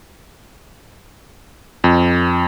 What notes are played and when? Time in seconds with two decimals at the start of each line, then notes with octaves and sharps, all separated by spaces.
1.84 F2